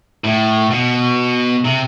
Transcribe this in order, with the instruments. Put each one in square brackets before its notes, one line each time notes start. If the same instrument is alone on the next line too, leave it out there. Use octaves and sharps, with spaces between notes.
[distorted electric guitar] A2
B2
C3